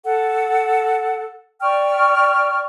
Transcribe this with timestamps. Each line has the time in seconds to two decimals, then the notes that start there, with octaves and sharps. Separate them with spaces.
0.04 A4 F#5
1.61 D5 G5 C#6 F6